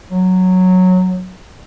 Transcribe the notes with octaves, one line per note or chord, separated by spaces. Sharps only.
F#3